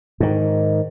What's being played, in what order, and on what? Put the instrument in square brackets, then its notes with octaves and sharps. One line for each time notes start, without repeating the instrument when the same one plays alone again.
[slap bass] G#2 D#3